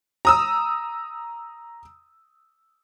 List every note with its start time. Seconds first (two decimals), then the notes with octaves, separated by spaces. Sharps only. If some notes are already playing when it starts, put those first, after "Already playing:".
0.25 A#5 D#6 E6